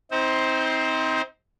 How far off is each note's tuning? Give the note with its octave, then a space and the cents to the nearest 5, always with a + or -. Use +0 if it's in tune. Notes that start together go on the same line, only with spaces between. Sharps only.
C4 +0 D#4 +35 C5 +0